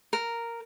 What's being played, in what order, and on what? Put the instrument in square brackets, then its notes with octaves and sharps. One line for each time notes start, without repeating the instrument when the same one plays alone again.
[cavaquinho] A#4